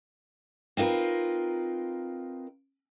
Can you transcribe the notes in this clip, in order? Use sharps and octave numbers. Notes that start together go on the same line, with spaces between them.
C4 D#4 F4 A#4 B4